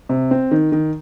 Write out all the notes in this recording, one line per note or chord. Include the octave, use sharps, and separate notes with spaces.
C3
C4
D#3
D#3